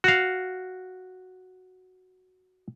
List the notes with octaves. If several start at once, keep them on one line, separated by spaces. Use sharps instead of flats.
F#4 F5